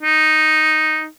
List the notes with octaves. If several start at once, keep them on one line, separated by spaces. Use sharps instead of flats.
D#4